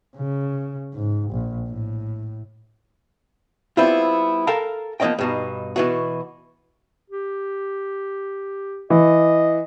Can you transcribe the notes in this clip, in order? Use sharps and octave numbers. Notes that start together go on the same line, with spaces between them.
C#3
G#2
A#1
A2
G3 B3 C4 E4 F4
A4 A#4 F5 G5 A#5
F3 A#3 B3 C#4 D#5 G5
G2 B2 D#4
B2 E3 F#4
G4
E3 D#5